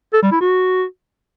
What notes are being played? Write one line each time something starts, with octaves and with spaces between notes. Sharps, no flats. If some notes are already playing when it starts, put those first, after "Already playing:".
A4
G3
E4
F#4